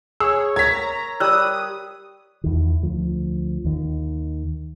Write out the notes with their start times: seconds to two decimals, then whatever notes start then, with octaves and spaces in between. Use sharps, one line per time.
0.20 G#4 C#5 E6
0.56 A#4 C#5 A#5 G#6 B6
1.20 G3 C#5 D#6 E6 F#6
2.44 E2 D#3
2.82 D2 F3
3.64 D#2 D#3